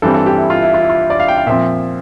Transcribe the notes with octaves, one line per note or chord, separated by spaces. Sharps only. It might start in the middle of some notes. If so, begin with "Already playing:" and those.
G2 E3 G3 C4 A4
A4
G4
E4
F4
E4
F4
E4
F4
D5
F5
G5
F5
A#2 F3 C4 E5